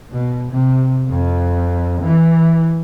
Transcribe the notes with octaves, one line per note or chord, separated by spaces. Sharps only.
B2
C3
F2
E3